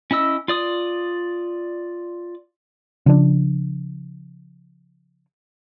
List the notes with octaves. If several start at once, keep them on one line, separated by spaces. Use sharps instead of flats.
C#4 E4 D#5 E6
F4 D5 D#6
C#3 F3 D4